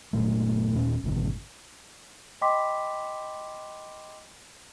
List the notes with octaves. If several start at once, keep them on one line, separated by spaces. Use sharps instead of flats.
F#1 A#2 A3
D#1 A#2 C#4
G#1 F#2 B2 D3
D#5 G5 B5 C6 D6 B6